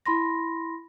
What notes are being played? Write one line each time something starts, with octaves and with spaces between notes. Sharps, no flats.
E4 B5 C6 A#6